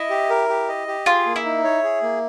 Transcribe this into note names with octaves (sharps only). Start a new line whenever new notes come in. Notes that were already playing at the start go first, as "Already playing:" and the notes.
Already playing: E4 D#5
G4
A#4
G4
D#5
G4
F4 G#4
A#3
E4
D#4
C#5
G#4
A#3